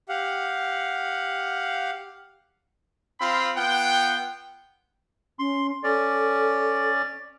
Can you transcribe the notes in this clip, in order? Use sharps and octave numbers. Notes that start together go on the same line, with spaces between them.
G4 F5 F#5
C4 F4 F5 B5 C6
B3 F4 F#5 G5
C#4 C6
C#4 A4 D5